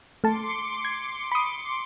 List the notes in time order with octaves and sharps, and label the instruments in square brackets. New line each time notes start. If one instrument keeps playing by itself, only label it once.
[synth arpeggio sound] A3 A5 [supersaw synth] C6 D6 C#7
[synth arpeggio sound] G#6
B5 D#6